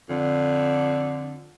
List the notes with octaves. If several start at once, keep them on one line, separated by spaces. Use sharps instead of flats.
F2 D3